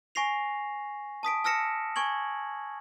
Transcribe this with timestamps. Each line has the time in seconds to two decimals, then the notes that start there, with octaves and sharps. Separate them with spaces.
0.15 G#5 C#6 A#6 C7 F7
1.23 A5 D#6 B6 D7
1.44 A5 E6 F6 A#6 C#7 E7
1.96 G#5 C#6 G#6 F#7